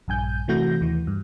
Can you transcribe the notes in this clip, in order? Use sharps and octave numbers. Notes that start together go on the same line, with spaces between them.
A#1 G2 G#5 G6
C3 E3 A3 F#4 G6 A#6
D#2 E3
G2